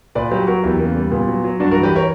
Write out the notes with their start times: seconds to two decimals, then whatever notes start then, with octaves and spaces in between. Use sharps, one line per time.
0.15 A#2 B4 D5
0.31 F#3 G4 B4
0.47 F#3 F#4 A#4
0.63 E2 E4 G4
0.79 C#3 A#3
0.95 G3 A#3
1.11 A#2 B3
1.28 F#3
1.44 F#3
1.59 G2 D4 F#4
1.71 F#4 A#4
1.76 E3
1.83 G4 B4
1.96 A#4 C#5